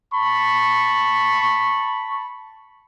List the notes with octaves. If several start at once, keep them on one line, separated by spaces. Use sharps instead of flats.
A5 B5 C#6